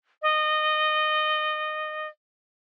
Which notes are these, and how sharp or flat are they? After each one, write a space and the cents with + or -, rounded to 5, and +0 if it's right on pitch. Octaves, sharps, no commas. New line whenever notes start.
D#5 -20